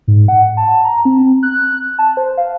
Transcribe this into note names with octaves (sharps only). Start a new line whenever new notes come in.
G#2
F#5
A5
A#5
C4
F#6
A5
C5
F5